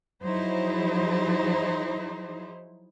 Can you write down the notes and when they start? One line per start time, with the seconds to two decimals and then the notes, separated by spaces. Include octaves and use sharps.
0.23 F3 F#3 D#4 E4 G#4 C5